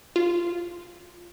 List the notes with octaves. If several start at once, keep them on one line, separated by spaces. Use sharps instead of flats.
F4